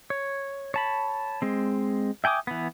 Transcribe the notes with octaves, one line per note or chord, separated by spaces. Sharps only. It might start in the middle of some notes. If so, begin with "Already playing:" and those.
C#5
C#5 A5 B5
G#3 C4
E5 G5 G#5 D6 D#6
E3 B3